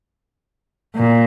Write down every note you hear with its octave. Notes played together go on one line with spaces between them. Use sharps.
A#2